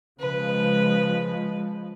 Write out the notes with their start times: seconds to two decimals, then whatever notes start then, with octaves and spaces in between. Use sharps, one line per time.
0.19 C#3 F3 G#3 B4